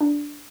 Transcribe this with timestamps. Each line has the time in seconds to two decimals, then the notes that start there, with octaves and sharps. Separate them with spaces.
0.01 D4